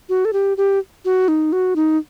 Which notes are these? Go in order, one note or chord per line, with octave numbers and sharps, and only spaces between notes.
F#4
A4
G4
G4
F#4
D#4
F#4
D#4